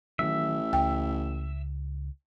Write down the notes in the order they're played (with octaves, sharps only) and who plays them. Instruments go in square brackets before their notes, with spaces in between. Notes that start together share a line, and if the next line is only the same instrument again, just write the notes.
[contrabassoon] A1 [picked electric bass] D#3 F#3 [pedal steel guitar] E5
[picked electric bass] C#2 [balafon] G5